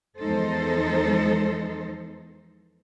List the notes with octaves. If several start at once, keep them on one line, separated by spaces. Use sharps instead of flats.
E2 F3 G#3 D#4 A4 C5